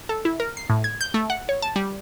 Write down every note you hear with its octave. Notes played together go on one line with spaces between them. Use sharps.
A4
E4
A#4
C7
A2
G#6
G6
A3
F#5
C#5
A5
G3